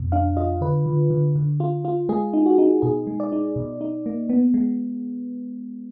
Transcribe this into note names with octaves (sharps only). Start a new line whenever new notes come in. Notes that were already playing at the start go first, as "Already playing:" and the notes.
Already playing: F2 B2
D4 F5
F4 D#5
D3 B4
D3
D3
D3
F4
F4
G#3 G#4
D#4
F#4
D#4
B2 G#4
G#3
D5
D#4
B2
D#4
A#3
B3
G#3